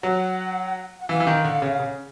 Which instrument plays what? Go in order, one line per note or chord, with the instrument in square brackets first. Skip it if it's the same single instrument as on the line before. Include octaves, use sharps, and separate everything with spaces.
[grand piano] F#3 [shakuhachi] F#5
[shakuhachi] F#5
[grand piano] E3 [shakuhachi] F5
[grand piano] E3
D#3
D3
C#3
C#3